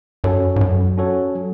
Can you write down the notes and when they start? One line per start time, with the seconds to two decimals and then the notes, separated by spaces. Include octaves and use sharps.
0.24 F#2 C#4 F#4 A4 C#5
0.56 G#2
0.61 F#2 F#3
0.98 C#4 F#4 A4 C#5
1.35 F#3